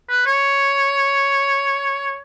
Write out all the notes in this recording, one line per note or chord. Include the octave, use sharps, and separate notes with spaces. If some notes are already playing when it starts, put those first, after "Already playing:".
B4
C#5